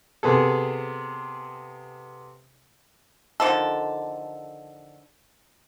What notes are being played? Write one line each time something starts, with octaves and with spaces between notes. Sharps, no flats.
C3 B3 G#4 A4
D3 D#3 F3 A4